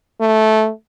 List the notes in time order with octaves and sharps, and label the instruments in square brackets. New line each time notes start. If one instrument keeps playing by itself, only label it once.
[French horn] A3